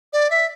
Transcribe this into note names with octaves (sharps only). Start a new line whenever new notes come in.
D5
E5